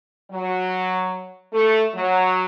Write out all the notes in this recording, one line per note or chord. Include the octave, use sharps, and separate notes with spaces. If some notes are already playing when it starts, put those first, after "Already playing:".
F#3
A3
F#3